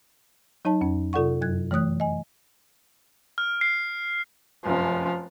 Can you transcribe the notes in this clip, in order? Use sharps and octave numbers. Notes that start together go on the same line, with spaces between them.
F#3 D#4 C#5 A5
F2 C#4
C3 F4 A4 D5 F#5 C#6
F#2 F#3 F#6 G#6
E3 A3 C#5 D#6 F#6
D#5 G#5
F6
C7
F1 F#2 F3